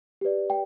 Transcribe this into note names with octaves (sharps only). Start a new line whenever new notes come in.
G4 B4 D5
G5